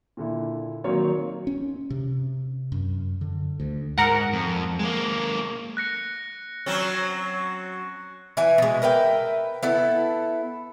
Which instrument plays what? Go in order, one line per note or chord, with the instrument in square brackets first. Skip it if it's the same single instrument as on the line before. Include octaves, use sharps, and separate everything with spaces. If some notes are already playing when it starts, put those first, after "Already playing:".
[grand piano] A#2 D3 E4
D#3 F#3 A#3 C4 C#5
[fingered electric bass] C#4
C3
F#2
D3
D2
[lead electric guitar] G#2 [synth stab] A#4 F#5
[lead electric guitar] F2
G#3 A#3
[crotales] F#6 A#6 C#7
[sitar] F#3 C4 C#4
[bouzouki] E3 E5 G#5
B2 G#3
A#4 B4 E5 G5
B3 E4 A4